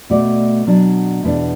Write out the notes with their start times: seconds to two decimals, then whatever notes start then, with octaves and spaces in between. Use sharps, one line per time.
0.10 B2 A3 F#4 D5
0.67 B2 F#3 D4 F#4
1.23 E2 B2 B3 D4